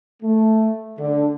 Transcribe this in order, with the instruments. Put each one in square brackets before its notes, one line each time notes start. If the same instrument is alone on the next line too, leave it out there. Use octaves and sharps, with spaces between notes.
[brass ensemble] A3
D3